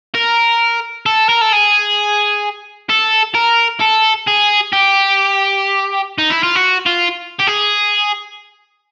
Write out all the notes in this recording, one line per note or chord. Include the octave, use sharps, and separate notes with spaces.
A#4
A4
A#4
A4
G#4
A4
A#4
A4
G#4
G4
D#4
E4
F4
F#4
F4
G4
G#4